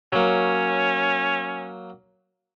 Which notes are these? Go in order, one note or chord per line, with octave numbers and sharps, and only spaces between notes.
F#3 A#3 C#4